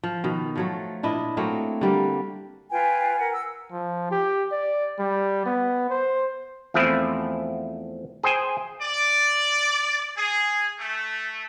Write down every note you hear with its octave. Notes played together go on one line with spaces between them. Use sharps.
F3
B2 D#3
F3 F#3 A3
A#2 D4 E4 D#5
F#3 A3 A#3 C4
D3 G3 A#3
F4 B4 G5 G#5
A#4 F#5
E6
F3
G4
D5
G3
B3
C5
E2 F3 A3 C4 E4
G#4 C5 G5 G#5
D5
G#4
A3